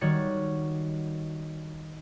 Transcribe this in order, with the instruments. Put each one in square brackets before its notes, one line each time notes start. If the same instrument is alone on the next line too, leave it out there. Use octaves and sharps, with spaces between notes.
[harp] D#3 G3 F#4 C#5 A6 C#7